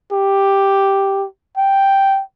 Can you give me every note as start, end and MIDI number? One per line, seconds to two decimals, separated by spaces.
0.12 1.26 67
1.57 2.22 79